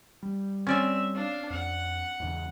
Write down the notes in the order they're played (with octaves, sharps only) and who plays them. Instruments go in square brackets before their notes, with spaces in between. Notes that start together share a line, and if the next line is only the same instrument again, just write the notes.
[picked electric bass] G3
[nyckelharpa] C4 E5 [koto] C#4 D5 G#5
[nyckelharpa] D4 F5
[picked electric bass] F2 [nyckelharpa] F#5
[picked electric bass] E2 G#2 C#3